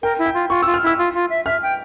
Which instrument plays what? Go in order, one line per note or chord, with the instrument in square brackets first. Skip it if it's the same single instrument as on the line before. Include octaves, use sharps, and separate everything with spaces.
[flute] A#4 [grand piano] G5
[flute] E4
[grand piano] G5
[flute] F4
[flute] F4 [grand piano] C#6
[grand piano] E6
[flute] F4
[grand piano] F6
[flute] E4 [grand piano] E6
[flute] F4
F4
E5
[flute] E5 [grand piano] F6
[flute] G5